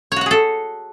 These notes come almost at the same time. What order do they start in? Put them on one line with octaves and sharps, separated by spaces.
C#5 F#4 F#5 G#4 A4